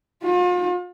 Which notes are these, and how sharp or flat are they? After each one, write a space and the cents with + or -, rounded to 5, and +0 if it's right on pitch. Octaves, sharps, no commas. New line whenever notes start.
F4 +40